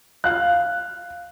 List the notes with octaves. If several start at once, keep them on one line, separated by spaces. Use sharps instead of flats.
F5 F#6